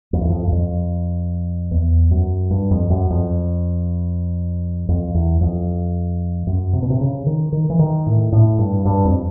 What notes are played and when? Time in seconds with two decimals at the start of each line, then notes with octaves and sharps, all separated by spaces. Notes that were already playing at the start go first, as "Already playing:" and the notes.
0.13 F2
0.21 E2
0.30 F2
0.47 F#2
0.52 F2
1.71 E2
2.11 F#2
2.50 G2
2.71 F2
2.90 F#2
3.10 F2
4.89 F2
5.14 E2
5.41 F2
6.47 F#2
6.73 C3
6.82 B2
6.90 C3
7.01 C#3
7.26 D#3
7.52 D#3
7.70 E3
7.79 D#3
8.06 A2
8.32 A2
8.58 G2
8.85 G2
9.05 F2